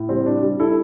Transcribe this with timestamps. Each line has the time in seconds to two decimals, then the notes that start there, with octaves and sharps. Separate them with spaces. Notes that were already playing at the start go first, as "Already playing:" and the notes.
Already playing: A2
0.09 G3 C4
0.26 D4
0.43 G3
0.59 E4 A4